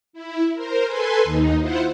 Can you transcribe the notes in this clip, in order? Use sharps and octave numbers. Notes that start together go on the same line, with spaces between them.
E4
A#4 C5
A4 B4 G#5 C6
D#2 D#4
E4 F4 C5 F#5